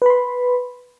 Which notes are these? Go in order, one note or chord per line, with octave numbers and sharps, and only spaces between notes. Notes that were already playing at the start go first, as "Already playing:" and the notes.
B4 B5 C6